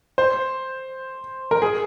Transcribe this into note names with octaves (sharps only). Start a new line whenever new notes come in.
C5
A#4
G#4